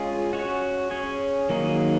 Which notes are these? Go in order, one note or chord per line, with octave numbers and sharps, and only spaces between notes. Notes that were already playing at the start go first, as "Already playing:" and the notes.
Already playing: G#3 C#4 F4 G#4
C#4 F#4 C#5
C#4 G#4 C#5
D#3 F#3 A#3 D#4 G#4